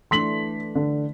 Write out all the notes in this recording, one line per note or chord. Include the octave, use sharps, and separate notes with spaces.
E3 A3 D4 C6 B6 F#7
D3